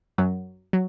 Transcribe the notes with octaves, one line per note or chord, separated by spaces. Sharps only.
F#2 F#3
F#3